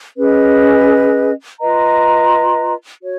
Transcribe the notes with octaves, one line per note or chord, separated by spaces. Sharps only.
C#4 G#4 B4 D#5
F4 B4 D#5 A#5
F#4 C#5